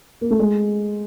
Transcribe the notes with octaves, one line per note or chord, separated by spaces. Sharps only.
A#3
A3
G#3